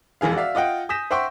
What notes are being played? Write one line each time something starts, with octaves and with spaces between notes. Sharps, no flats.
E1 F2 E3 G#4 F5
F#4 D5 E5 F5
F4 D#5 F#5 G5
G#5 D#6 G6 A#6 B6 E7
C5 E5 F#5 G5 C6 C#6